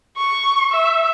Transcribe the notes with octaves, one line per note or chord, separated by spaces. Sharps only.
C#6
E5